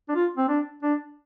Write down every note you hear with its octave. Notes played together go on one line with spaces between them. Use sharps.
D4
F4
C4
D4
D4